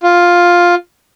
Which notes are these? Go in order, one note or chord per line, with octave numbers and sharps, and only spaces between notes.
F4